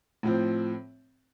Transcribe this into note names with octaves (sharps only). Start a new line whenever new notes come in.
A2 F3 C4